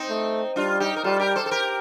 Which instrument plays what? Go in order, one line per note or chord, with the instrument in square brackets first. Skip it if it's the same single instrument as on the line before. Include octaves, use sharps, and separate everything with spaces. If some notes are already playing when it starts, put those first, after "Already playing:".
Already playing: [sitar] C4 D#4
[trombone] A3
[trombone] G3 [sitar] D4 F4
[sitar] D#4 G4
A#4
[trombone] G3 [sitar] F4 A4
[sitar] G4 A#4
A4 C5
A4
G4 A#4